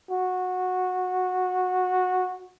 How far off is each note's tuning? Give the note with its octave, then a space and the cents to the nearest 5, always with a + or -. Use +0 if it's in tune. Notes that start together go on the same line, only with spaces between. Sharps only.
F#4 -15